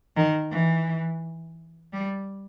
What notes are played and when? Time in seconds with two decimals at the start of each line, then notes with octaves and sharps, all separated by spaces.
0.16 D#3
0.51 E3
1.93 G3